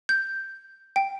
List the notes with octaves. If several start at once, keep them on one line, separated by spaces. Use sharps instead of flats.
G6
G5